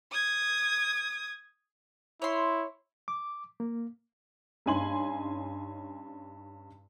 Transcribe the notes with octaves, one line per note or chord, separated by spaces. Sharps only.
D#6 G#6
E4 C#5 C6
D6
A#3
G2 C#4 D#4 G#5 C6 F#7